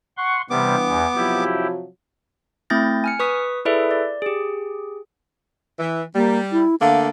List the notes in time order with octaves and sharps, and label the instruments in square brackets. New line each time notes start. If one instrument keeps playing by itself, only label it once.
[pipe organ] F#5 C6 C#6
[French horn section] G2 E3 [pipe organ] C3 G3 [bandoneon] B3 D6
[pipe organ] E2
[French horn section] C3 F3 F#3 [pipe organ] E4 G4
[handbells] A3 C4 E4 G6 A6 A#6
G#5 F6 C#7
B4 C#6 D#6 B6
E4 G#4 A4 B4 D5 E5
D5
G4 G#4
[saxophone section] E3
[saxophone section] G3 [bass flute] A#3
[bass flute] E4
[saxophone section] D3 A3 A#3 [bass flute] F5